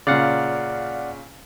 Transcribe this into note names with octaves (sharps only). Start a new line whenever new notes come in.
A#2 C#3 D5 F5 F#5